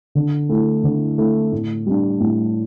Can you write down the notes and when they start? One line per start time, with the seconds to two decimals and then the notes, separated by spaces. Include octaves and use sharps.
0.15 D3
0.49 A3 E4
0.84 D3
1.18 A3 E4
1.52 A2
1.86 G3 D4
2.20 A2